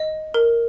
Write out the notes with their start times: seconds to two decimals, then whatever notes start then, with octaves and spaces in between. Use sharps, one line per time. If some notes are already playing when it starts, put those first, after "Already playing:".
Already playing: D#5
0.34 A#4